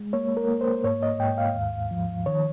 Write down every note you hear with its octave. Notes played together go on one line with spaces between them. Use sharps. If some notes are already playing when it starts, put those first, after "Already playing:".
Already playing: G#3
A#3 C#5
A#4
A#3
C5
G#2 C#5
D#5
G#2 G5
F5
D#2
F3
D#3 C#5